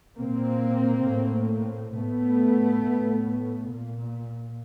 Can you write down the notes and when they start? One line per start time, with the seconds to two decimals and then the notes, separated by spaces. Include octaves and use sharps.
0.18 A#2 A#3 C4
1.06 A2
1.94 A2 A3 B3
2.82 A2
3.71 A#2